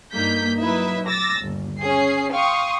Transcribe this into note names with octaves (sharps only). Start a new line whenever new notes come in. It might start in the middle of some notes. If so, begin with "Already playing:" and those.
G2 A#3 D#4 G6 B6
F#3 D#4 E4 B4 E5
D6 E6 A6 A#6
G1 D#2
C#4 G#4 C7
F5 G5 C6 C#6 D#6